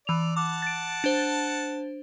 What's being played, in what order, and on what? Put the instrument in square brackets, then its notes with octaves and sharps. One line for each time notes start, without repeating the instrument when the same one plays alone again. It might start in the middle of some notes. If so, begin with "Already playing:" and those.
[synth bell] E3 F7 [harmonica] D5
[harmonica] F#5 A5 [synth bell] D6
[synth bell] A6 D7
D4 C5